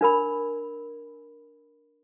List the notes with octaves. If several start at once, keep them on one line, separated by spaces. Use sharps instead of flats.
D4 A#4 B5